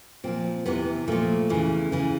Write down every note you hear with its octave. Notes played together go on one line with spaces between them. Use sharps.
A#2 F3 C4
E2 C3 E3 B3
A#2 F3 A3
E2 C#3 E3
C#3 E3